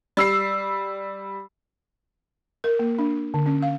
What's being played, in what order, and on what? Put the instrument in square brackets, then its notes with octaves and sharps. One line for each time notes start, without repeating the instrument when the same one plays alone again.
[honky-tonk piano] G3 E6 C7
[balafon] A#4
A#3
D4
D3
C#4
F5